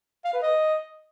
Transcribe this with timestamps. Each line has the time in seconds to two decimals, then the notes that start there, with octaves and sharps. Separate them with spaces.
0.24 F5
0.33 B4
0.42 D#5